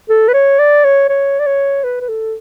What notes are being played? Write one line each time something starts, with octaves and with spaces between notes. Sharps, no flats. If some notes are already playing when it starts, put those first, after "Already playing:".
A4
B4
C#5
D5
C#5
C#5
D5
C#5
B4
B4
A4